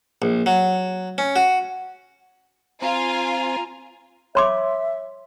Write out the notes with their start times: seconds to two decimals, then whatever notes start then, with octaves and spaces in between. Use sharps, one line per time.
0.22 A#1
0.46 F#3
1.18 C#4
1.36 F#4
2.82 C4 F4 C5 G#5 A#5
4.35 C#5 E5 C6 D6